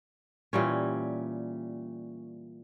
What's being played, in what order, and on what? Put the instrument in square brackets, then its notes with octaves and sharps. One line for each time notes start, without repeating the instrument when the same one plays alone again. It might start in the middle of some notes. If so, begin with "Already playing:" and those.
[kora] A#2 E3 G3 C#4